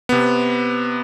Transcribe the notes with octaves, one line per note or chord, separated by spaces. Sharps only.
C3 B3